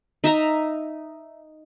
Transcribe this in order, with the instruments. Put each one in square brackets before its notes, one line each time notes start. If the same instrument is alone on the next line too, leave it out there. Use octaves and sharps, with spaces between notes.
[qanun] D#4 E5 A#5